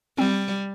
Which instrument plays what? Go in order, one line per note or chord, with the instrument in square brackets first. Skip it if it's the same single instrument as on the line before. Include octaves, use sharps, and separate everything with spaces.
[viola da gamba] G3 [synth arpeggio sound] C4